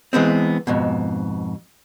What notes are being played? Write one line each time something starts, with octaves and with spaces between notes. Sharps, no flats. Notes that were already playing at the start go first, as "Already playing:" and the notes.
E3 G#3 B3 C4
F2 G#2 B2